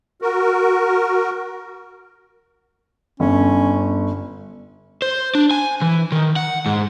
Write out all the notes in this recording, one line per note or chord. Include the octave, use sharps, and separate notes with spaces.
F#4 A#4
G1 C#4
C5
D4
G#5
E3
D#3
F#5
G#2